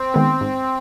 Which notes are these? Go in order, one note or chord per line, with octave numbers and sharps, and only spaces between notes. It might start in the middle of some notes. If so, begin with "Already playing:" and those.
Already playing: C4
D#3 G#3 B3
G#2